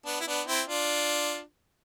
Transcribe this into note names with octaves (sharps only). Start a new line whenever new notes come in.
B3 D4
E4
B3 D4
C4 E4
D4 F4